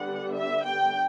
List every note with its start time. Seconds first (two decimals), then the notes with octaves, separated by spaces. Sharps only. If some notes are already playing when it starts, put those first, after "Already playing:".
Already playing: D3 G3 B3 D4 F#5
0.33 E5
0.64 G5